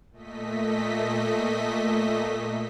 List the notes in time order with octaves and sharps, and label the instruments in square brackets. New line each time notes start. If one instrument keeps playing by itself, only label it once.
[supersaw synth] A#2 A3 D#5 B6